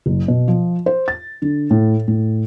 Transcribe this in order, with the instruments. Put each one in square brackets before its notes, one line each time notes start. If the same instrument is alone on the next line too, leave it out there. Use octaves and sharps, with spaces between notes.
[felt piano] F#1
B2
F3
C5
A6
D3
A2
A2